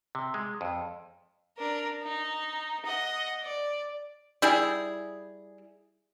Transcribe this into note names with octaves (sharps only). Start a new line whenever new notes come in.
C3
G#3
F2
D4 A#4
D#4
D#5 F#5
D5
G3 E4 G#4